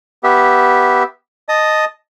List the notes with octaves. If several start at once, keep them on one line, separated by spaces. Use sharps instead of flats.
B3 G4 E5
D#5 A5 D#6